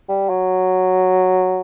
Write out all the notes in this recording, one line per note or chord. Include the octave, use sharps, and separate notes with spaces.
G3
F#3